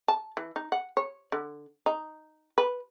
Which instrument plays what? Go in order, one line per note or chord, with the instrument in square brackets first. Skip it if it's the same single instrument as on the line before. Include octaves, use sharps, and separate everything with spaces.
[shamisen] A5
E3
D#4
F#5
C#5
D3
D#4
B4